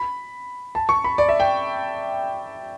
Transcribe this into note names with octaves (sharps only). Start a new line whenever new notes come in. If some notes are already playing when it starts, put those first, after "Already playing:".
Already playing: B5
A5
C#6
B5
D5
E5
G5